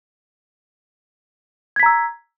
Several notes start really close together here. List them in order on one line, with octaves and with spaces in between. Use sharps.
G#6 B6 A#5 E6